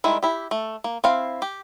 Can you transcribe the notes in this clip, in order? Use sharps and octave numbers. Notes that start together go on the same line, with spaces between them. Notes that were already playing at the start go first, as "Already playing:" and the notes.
D#3 G3 G#3 E4
E4 G4
A3
A#3
C4 E4 F5
G4